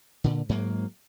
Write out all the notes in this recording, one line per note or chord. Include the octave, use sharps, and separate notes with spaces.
A#2 D3
G#2 F#3 A#3